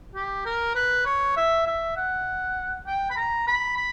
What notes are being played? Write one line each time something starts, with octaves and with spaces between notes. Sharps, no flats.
G4
A#4
B4
C#5
E5
E5
F#5
G5
B5
A#5
B5
B5